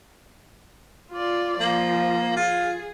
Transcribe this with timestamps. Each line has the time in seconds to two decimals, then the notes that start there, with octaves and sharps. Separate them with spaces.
1.12 F4 D5
1.60 F3 A#3
2.36 F4 G#4